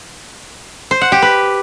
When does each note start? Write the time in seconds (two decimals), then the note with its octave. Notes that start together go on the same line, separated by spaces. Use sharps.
0.91 C5
1.01 F#5
1.12 G4
1.22 B4